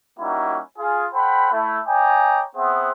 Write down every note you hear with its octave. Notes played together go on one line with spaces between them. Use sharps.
G3 A#3 C#4 D#4 E4 F#4
F4 G#4
A4 C5 F#5 G5 B5
A3 E4
C#5 D#5 G5 G#5 A#5 D6
B3 C4 G#4 C5 E5 F#5